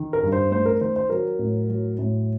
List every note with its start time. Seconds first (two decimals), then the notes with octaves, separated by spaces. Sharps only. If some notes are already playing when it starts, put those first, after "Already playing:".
Already playing: D#3
0.13 A#4
0.23 G2
0.32 C5
0.51 A3 C5
0.66 A#4
0.81 D#3 C5
0.96 C5
1.10 F#3 A#4
1.39 A2
1.69 F#3
1.98 A2